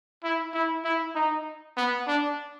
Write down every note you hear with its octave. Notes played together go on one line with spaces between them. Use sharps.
E4
E4
E4
D#4
B3
D4